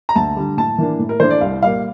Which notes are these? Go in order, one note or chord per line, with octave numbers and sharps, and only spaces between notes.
A#5
D2 A5
D3 G3
A2 A5
E3 A#3 D4
A2
A#4
E3 A3 D4 C5
D5
C2 F5
A#2 G3 A#3 F5